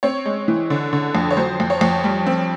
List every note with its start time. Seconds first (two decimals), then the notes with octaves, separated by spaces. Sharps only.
0.03 C4 C#5
0.25 G#3
0.48 E3
0.70 D3
0.93 D3
1.15 F2
1.31 C#5
1.37 F#3 C5
1.60 F2
1.70 C#5
1.81 F2
2.04 G3
2.26 C4